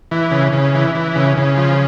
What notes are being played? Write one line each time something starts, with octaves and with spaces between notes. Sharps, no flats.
E3
C#3
C#3
E3
E3
C#3
C#3
F3